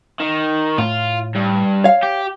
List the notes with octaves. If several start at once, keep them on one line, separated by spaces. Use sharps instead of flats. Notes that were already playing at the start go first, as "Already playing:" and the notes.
D#3
A2 F4
G2
C#5 F5
G4